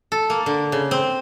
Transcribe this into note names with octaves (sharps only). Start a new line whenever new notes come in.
A4
A#3
D3
C#3
C4